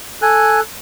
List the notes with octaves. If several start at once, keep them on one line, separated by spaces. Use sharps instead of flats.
A4 G#5 F#6